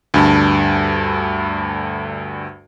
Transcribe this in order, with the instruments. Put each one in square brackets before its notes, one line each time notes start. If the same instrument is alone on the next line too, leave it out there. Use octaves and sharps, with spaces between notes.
[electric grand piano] D2 G2 A5